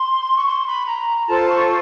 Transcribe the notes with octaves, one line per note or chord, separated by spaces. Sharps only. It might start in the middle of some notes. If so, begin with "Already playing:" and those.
Already playing: C6
C#6
C6
B5
A#5
A#5
F4 A4 C5 A5
C#6